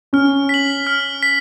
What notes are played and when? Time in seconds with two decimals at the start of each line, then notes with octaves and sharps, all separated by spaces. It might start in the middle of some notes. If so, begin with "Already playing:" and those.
0.13 C#4 F6
0.49 B6 F#7
0.87 F6
1.23 B6